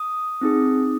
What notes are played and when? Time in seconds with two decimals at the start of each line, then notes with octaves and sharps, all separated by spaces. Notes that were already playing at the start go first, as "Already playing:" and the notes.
Already playing: D#6
0.41 C4 D#4 G#4